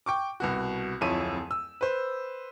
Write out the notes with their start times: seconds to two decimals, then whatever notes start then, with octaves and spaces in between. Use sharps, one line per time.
0.06 G5 C#6 D6
0.40 C2 B2 F#4
1.01 D1 F2 E4 C#5 D#7
1.51 E6
1.81 B4 C5